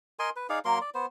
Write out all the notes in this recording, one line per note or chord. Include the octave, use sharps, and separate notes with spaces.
A#4 D#5 G#5 C6
B4
D#4 G#4 D5 F5
F#3 A#3 A#4 C6
D5
B3 C5